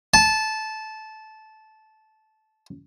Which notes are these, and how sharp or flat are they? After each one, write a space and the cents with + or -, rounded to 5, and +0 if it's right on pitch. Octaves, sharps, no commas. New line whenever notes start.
A5 -15